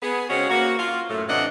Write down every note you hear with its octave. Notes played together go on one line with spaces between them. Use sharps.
B3 G#4
C#3 G#3 C4 C#4 F#4
A#3 F#4
F4
F#2 A2
C3 E3 D4 D#5 F#5